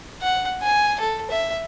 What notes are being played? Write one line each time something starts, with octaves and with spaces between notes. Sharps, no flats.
F#5
G#5
A4
E5